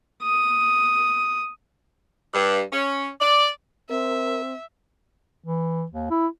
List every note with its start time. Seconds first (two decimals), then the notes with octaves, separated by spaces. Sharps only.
0.23 D#6
2.33 G2
2.71 C#4
3.19 D5
3.89 C4 A#4 E5
5.45 E3
5.91 D#2
6.10 E4